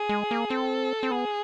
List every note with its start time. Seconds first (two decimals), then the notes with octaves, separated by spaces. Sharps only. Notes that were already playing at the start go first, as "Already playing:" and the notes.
Already playing: G#4
0.09 G#3
0.31 A#3
0.50 C4 A4
1.03 C4
1.11 B3 G#4